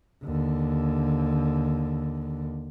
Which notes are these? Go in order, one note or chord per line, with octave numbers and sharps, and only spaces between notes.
D#2 D3